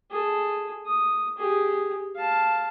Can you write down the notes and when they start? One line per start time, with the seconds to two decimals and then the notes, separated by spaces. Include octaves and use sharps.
0.10 G#4 A4
0.86 D#6
1.38 G4 G#4
2.16 F5 A5